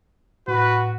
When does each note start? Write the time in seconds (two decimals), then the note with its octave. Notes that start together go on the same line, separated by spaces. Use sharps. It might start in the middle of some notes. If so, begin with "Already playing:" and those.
0.48 A2 F#4 B4